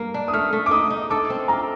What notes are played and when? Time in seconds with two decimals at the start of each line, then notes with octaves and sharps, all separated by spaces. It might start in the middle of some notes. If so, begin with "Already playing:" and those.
Already playing: G2 A#3
0.14 D4
0.28 D#6
0.33 A3 F6
0.53 A3
0.66 D6
0.71 D#4 D#6
0.90 D#4
1.10 A4 D6
1.30 C4
1.48 F4 A#5